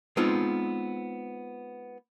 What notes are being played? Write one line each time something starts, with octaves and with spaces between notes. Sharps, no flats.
G#3 B3 C4 D#4 F4